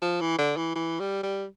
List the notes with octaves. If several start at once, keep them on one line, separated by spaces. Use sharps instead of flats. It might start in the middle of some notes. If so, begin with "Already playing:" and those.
F3
E3
D3
E3
E3
G3
G3